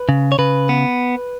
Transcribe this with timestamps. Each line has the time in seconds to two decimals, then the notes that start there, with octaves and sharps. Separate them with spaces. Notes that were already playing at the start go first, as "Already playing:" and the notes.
Already playing: B4
0.09 C#3
0.32 C#5
0.39 C#3 B4
0.69 B3